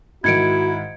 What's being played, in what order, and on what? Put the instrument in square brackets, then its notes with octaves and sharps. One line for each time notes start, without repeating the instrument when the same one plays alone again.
[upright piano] G#2 D#3 [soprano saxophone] E4 [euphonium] F#4 [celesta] G#6 C#7 D7